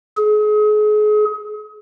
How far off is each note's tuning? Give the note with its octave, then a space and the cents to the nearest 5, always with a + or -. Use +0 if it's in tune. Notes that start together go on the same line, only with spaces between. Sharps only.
G#4 +35